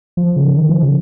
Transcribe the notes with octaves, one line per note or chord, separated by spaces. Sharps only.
F3
C#3
D#3
F3
C#3